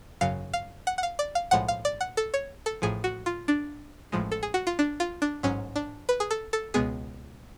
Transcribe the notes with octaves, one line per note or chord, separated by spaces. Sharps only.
G#1 F#2 C#3 F#3 F5
F5
F#5
F#5
F5
D5
F5
B1 A2 F3 G#3 F#5
F5
D5
F#5
A4
C#5
A4
A1 A2 F3 G#4
F#4
F4
D4
A1 A2 F3 G#3
A4
G#4
F#4
F4
D4
F4
D4
A1 G#2 F#3 C#4
D4
B4
G#4
A4
A4
C#2 B2 G#3 B3 G#4